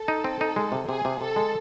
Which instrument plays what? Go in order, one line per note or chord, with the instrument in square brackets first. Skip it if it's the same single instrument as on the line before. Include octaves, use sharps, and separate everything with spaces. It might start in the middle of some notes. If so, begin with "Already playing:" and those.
Already playing: [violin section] A4
[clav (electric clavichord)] D#4
C4
D#4
G#3
C3
[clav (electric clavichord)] C3 [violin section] G#4
[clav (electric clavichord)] C3
[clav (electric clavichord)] C3 [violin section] A4
[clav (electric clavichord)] G#3